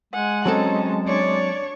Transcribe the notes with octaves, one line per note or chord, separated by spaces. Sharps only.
G#3 F#5 G#5
F#3 C4 C#4 D#4 A4 A5
D4 C#5 D5